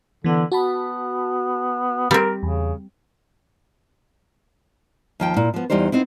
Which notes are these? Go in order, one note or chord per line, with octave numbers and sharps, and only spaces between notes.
D3 E3 B3
B3 F#4 A5 B5
G3 C4 A#4
E2 C#3
D#2 F3 G5
A#2 E4
F3 B3
E2 E3 G3 D#4 C5
B3 C4 D#4 E4